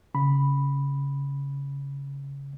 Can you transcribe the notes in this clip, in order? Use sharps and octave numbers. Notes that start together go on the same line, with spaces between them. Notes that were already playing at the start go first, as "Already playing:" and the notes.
C#3 B5